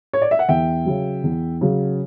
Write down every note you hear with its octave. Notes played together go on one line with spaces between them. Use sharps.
C#5
D5
E5
F#5
E2 E5 G5
C#3 F#3
E2
C#3 F#3